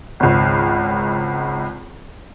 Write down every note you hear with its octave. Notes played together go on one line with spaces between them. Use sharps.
G#1 C#2